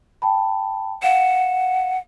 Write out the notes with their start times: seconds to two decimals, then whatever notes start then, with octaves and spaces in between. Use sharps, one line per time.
0.22 G5 A5 B5
1.03 F5 F#5 E7